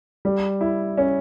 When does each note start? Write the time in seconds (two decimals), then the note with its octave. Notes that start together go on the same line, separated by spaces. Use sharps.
0.25 G3
0.61 E4
0.98 C#4